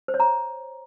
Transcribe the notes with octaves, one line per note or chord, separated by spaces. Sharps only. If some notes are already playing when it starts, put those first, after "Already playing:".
C5
C#5
A#5